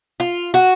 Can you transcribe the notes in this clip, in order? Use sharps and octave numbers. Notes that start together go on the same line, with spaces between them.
F4
F#4